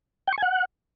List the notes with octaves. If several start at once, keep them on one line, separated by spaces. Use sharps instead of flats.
G5
C#6
G#5
F#5